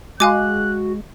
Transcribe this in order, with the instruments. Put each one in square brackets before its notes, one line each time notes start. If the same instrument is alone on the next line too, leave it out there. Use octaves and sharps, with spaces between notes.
[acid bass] G#3 [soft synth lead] F#4 [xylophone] F5 G#5 D6 [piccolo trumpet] F#6